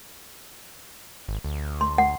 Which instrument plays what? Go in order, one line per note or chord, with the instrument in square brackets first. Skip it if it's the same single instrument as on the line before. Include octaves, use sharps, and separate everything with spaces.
[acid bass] G#1
D2
[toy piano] C6
F#5